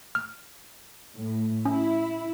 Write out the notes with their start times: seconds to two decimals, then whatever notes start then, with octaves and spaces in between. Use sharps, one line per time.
0.15 F6
1.15 A2
1.65 C#4 E4